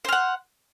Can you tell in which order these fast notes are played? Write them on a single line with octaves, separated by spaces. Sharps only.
C5 F6 F#5